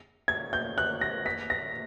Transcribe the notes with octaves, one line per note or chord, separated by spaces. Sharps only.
G#6
G6
F#6
A#6
B6
A#6